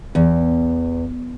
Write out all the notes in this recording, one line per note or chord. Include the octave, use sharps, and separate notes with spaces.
E2